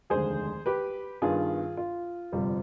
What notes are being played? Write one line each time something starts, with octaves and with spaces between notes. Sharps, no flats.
F1 D#2 D3 G#3 G#4 C5
G4 B4
G2 D#3 B3 D4 F4 G#4
F4
G1 F2 C3 G3 C4